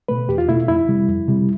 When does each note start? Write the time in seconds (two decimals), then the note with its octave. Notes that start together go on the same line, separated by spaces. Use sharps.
0.08 B2 A3 B4
0.28 E2 G4
0.38 F4
0.48 B2 A3 E4
0.68 F2 E4
0.88 C3 G3
1.08 F2
1.28 C3 G3